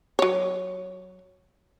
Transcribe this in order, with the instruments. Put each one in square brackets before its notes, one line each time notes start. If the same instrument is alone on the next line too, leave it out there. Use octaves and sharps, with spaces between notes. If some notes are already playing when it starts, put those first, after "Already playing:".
[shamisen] F#3 C#5